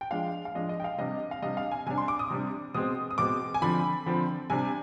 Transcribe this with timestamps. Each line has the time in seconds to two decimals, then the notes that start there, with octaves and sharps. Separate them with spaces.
0.01 G5
0.11 F3 G#3 D4 F5
0.45 F5
0.55 F3 G#3 D4 D#5
0.69 D#5
0.80 G5
0.84 F5
0.98 C3 G3 D4 D#5
1.31 F5
1.42 C3 G3 D4 D#5
1.57 F5
1.71 G#5
1.86 C3 G3 D4 G#5
1.98 C6
2.08 D6
2.19 D#6
2.30 C3 G3 D4
2.74 B2 G#3 C4 D#6
3.11 D#6
3.18 B2 G#3 C4 D6
3.54 G#5
3.62 D3 F3 C4 B5
4.06 D3 F3 C4
4.50 C3 G3 D4 G#5